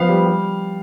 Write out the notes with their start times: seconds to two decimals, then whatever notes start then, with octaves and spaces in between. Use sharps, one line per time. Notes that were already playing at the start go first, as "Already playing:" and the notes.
Already playing: F3 B3 F5
0.09 G3
0.26 G3